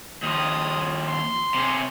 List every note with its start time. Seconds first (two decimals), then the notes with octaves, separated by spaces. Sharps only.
0.23 D#2 F3 D#6
1.08 C6
1.55 C3 C#4